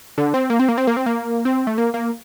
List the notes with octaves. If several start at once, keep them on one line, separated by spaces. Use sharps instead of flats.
D3
C4
A#3
C4
A#3
C4
A#3
C4
A#3
C4
A3
A#3
A#3